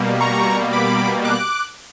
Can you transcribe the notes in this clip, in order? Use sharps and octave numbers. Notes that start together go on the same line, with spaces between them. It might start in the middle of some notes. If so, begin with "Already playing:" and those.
Already playing: B2 G3 A#3
A#5 C#6
B5 D6
D6 F#6